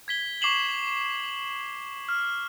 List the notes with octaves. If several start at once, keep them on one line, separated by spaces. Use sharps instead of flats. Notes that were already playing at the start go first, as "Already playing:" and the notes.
G#6 B6 G7
C#6 D6 C7 E7 F#7 G7
F6